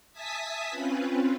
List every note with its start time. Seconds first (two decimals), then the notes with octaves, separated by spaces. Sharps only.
0.12 E5 G#5 A5 D#6 B6
0.70 C4 C#4 F4 B4